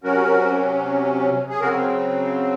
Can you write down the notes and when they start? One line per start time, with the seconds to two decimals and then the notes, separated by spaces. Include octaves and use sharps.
0.04 C3 F#3 C#4 F#4 A#4
1.49 G#4
1.61 C#3 F#3 C4 F#4 A#4